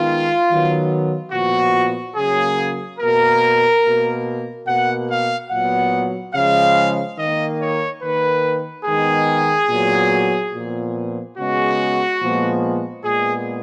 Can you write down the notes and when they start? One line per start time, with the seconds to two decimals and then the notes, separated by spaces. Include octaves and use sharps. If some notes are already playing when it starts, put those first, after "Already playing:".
Already playing: D#3 G#3 B3 F4
0.48 D#3 F#3 B3
1.32 A#2 F3 B3 F#4
2.16 C#3 F#3 A#3 G#4
2.99 B2 A#3 A#4
3.83 B2 A#3
4.67 B2 A#3 F#5
5.09 F5
5.50 A#2 F#3 B3 F#5
6.34 C#3 F3 G#3 F5
7.18 D#3 A#3 D#5
7.60 C#5
8.02 D#3 A#3 B4
8.86 D#3 G#3 B3 G#4
9.69 A#2 F#3 B3
10.53 A#2 F3 B3
11.37 C#3 G#3 B3 F#4
12.20 A#2 F3 G#3 B3
13.04 A#2 G#3 B3 G#4